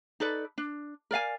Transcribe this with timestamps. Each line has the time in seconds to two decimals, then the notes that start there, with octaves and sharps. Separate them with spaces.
0.20 D#4 A4 B4 D5
0.58 D4
1.11 A#4 D5 F5 G#5